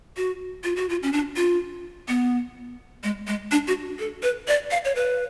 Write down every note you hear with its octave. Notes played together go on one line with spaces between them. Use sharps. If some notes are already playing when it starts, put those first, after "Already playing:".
F#4
F4
F#4
F4
C#4
D4
F4
B3
G#3
G#3
D4
F#4
A4
B4
D5
F5
C#5
B4